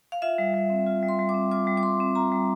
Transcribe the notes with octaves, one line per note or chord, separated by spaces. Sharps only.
F5
F4 E5
G3
G3
C4
F4
G3
C6
G3
D6
C4
F4 D6
G3
D6
G3 C6
C4
F4 A#5
G3